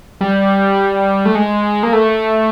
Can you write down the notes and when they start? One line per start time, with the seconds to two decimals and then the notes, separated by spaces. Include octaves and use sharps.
0.21 G3
1.25 A3
1.35 G#3
1.83 A#3
1.93 A3